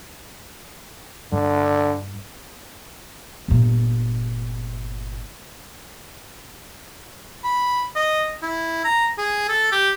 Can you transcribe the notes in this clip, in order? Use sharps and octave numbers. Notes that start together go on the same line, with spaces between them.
G2 D3
G1 A#2
B5
D#5
E4
A#5
G#4
A4
G4